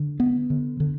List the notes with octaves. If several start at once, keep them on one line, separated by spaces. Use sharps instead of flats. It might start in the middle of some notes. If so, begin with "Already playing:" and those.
Already playing: D3
B3
D3
D3